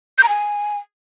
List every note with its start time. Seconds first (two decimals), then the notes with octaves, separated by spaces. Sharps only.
0.18 G6
0.23 A#5
0.29 G#5